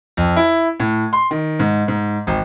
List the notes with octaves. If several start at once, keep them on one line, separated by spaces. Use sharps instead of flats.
F2
E4
A2
C6
D#3
G#2
G#2
G#1